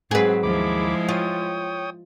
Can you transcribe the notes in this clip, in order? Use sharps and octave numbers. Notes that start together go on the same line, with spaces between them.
G#2 F#3 C4 G#4 B4
D#2 F3 G#3 E4 B5 D6
F4 C#5 G5 D#6